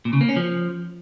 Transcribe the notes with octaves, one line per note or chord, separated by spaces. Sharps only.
A#2
C#3
A#3
C#4
F3